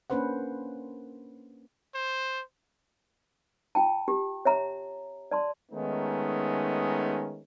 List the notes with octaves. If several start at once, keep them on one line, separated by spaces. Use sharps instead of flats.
A#3 C#4 D4 B4 C5 F#5
C5
F4 G5 A5
G4
C#5 E5 A#5
D5 A5 C6
D#3 G#3 A3 B3 C#4 D#4